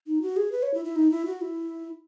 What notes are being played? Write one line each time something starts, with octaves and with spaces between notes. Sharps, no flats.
D#4
F#4
G#4
B4
C#5
E4
E4
D#4
E4
F#4
E4